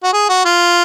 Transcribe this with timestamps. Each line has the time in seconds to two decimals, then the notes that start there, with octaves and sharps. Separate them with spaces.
0.03 F#4
0.13 G#4
0.29 F#4
0.45 F4